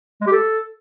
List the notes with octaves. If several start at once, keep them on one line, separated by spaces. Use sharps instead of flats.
G#3
G4
A4